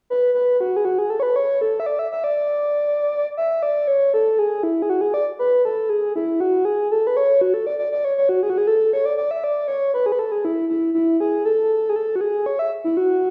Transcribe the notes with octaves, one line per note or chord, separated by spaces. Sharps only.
B4
B4
F#4
G#4
F#4
G#4
A4
C#5
B4
C#5
A4
E5
D5
E5
E5
D5
E5
D5
C#5
A4
G#4
E4
G#4
F#4
G#4
D5
B4
A4
G#4
E4
F#4
G#4
A4
B4
C#5
F#4
A4
D5
D5
D5
C#5
C#5
F#4
G#4
F#4
G#4
A4
C#5
D5
D5
E5
D5
C#5
B4
G#4
B4
A4
G#4
E4
E4
E4
G#4
A4
G#4
A4
F#4
G#4
C#5
E5
E4
F#4